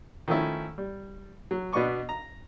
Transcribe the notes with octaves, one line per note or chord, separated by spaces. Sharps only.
D#3 F3 A3 C#4 E4
G3
F#3
B2 B3 D4 D#5 C#6 D6
A#5